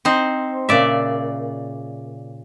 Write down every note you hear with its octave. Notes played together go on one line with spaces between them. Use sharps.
C4 D#4 C5
A#2 C#3 D5 E5